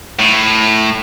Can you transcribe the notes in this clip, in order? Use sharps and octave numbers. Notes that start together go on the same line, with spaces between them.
A2